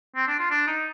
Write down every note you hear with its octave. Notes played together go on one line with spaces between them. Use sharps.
C4
D4
F4
D4
D#4